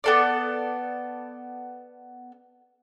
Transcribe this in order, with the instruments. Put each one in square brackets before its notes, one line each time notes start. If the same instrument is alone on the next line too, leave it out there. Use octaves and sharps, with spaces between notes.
[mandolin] B3 A4 D5